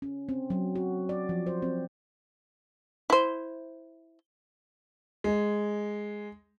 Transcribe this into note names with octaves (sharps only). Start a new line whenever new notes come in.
C#4
C4
F#3
F#4
D5
F3
C5
C4
E4 C5
G#3